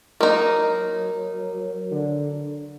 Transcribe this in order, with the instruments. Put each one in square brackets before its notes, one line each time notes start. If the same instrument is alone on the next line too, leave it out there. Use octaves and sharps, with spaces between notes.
[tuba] F#3 [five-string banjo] A#3 D#4 [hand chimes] A#4
[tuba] D3